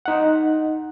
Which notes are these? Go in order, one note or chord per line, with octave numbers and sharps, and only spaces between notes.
D#4 F#5